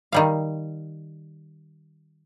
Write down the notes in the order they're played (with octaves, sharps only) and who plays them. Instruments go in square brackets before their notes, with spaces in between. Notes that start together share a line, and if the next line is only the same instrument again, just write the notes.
[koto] D#3 G3 F5